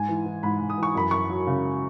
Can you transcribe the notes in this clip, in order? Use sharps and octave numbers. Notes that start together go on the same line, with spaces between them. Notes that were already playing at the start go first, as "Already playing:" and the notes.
Already playing: G#2 G#5
E3
E3
G#2 B5
G#2
D#6
E3
C#6
F#2 B5
F#2 C#6
F#3
C#3